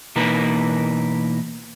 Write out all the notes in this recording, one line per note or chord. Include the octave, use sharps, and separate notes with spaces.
B2 E3 A#3 D#4 A#4 B4